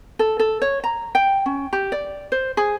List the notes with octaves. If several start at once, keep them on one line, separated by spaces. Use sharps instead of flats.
A4
A4
C#5
A#5
G5
C#4
G4
D5
C5
G#4